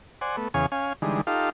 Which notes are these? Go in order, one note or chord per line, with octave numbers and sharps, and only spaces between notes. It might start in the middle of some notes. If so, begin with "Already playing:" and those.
C5 D5 F#5 G#5
A3 B3
E2 C#3 G#4 C#5 F5 G#5
C#4 F5 G#5
D3 E3 G3 G#3 D#4
D#4 F4 G4 A4 F5